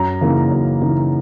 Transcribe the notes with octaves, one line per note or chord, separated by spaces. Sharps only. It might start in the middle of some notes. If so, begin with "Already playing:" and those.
Already playing: F#2 A#5
C#3 E3 A#3 D#4
F#2
C#3 E3 A#3 D#4